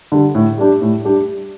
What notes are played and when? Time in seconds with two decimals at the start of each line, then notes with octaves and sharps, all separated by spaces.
0.12 D3 G3
0.35 A2
0.58 G3 D4 G4
0.82 A2
1.05 G3 D4 G4